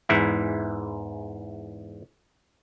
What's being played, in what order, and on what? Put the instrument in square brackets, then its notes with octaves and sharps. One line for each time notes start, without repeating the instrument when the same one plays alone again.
[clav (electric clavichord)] E2 G#2 E3 E4